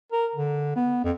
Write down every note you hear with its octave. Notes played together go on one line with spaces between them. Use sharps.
A#4
D3
B3
F2